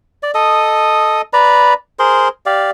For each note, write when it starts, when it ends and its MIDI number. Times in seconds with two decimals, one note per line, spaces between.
0.23 0.31 74
0.35 1.22 69
0.35 1.22 75
0.35 1.22 87
1.33 1.74 71
1.33 1.74 74
1.33 1.74 82
1.33 1.74 83
1.99 2.28 68
1.99 2.28 70
1.99 2.28 72
1.99 2.28 84
2.46 2.71 67
2.46 2.71 74
2.46 2.71 77